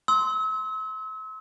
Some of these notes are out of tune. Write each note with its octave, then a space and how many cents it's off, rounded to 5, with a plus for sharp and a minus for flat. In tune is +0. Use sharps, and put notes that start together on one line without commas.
C6 +0 E6 -40